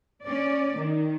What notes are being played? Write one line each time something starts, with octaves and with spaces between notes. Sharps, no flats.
C#4 D5
D#3